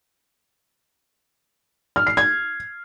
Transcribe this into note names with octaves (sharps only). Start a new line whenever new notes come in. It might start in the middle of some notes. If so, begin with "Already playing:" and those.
F6
C7
G#6